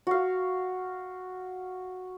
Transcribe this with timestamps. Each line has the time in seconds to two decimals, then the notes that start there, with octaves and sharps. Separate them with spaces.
0.07 F#4 F5